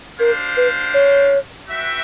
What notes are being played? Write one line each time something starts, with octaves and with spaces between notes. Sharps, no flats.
D4 G4 A#4 C5 F5
B4
C#5
F#4 B4 E5 G5